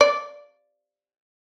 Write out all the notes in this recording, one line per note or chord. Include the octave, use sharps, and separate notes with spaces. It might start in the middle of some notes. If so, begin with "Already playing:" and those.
D5